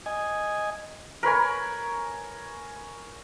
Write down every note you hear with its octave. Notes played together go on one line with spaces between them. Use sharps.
D#5 G#5
A#4 B4 C#5 G#5